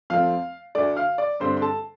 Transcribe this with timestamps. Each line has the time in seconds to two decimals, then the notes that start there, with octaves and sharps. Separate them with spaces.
0.10 F2 F3 A3 C4 F5 F6
0.75 D2 D3 A3 D5 D6
0.97 F5 F6
1.18 D5 D6
1.40 G2 D3 G3 C4 C5 C6
1.57 C6
1.62 A4 A5